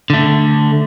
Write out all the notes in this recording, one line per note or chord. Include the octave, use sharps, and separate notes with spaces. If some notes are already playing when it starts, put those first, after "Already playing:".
D3 A3